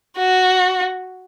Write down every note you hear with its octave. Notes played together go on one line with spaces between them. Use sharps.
F#4